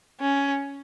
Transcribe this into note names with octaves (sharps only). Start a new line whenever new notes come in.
C#4